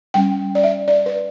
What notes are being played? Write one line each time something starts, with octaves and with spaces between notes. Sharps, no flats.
G3 C#4 G5
D5
E5
D5
B4